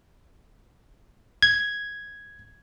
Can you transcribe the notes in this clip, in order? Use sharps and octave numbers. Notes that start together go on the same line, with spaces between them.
G#6